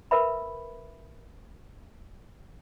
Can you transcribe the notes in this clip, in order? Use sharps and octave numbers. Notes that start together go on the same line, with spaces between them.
A#4 B4 E5 B5